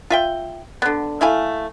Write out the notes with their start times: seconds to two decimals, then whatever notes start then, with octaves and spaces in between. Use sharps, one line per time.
0.10 F4 E5 G5
0.82 D3 B3
1.21 A3 E4 F5 G#5